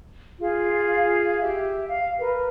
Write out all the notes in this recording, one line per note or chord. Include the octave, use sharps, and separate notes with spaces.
F4 G#4 F5
G4 E5
F5
A#4 B4